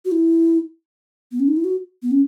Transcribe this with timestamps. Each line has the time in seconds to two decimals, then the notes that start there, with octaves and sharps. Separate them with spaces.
0.05 F#4
0.12 E4
1.32 B3
1.40 C#4
1.48 D#4
1.57 E4
1.64 F#4
2.03 B3
2.11 C#4